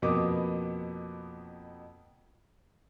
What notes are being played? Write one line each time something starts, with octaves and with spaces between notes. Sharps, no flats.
F2 B2 A#3 B3 D6 D#6